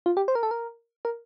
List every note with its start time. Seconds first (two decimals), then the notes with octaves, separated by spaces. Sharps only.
0.06 F4
0.17 G4
0.28 C5
0.35 A#4
0.43 A4
0.51 A#4
1.05 A#4